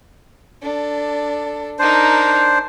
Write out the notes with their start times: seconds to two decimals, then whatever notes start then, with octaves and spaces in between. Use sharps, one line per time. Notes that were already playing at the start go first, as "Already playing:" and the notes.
0.61 D4 A4
1.79 D4 D#4 A#4 C5